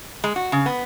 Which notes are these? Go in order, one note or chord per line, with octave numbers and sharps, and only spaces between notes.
G#3
F#4
C#3
B3